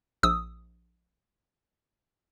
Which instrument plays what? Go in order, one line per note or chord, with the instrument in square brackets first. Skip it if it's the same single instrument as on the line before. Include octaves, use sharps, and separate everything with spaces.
[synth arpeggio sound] A#1 D#6 E6